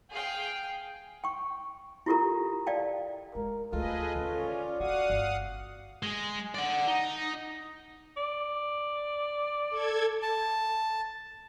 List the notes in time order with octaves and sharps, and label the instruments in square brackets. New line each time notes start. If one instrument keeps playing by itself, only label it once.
[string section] G#4 F5 G5
[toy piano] G5 C#6
E4 F4 G4 A4 A#4 A#5
D5 D#5 F5 G5 A5
[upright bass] G#3 [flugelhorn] A#4
[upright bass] D2 [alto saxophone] F4 [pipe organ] G#4 B4 D#5 [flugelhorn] A4
[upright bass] D3 D#3 [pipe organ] C#4
[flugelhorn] D5
[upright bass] D3 [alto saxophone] F#4 [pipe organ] F5 F#5 D#6
[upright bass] G1
[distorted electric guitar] G#3
D5 F#5
D#4
[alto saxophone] D5
[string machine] A4 G#6
[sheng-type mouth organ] A5